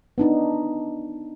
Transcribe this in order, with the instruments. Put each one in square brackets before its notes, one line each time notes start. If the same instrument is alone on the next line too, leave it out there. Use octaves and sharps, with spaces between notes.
[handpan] B3 D4 D#4